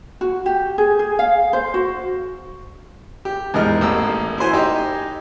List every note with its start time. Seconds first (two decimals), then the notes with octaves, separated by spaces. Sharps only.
0.21 F#4
0.46 G4
0.78 G#4
0.99 G#4
1.19 F5
1.53 C5
1.74 F#4
3.25 G4
3.54 E2 G#2 A#4 D#5 F6
3.81 A1 A#3 D#6 E6
4.38 E4 F#4 C5 G#5
4.53 D#4 G4